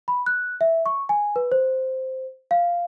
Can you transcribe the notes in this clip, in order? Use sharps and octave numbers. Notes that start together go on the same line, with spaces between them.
B5
F#6
E5
C#6
G#5
B4
C5
F5